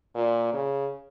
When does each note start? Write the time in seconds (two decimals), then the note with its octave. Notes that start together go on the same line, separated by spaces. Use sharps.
0.15 A#2
0.54 C#3